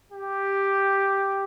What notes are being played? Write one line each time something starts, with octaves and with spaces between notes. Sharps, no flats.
G4